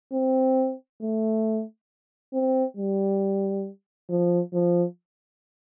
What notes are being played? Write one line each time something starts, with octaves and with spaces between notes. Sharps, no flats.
C4
A3
C4
G3
F3
F3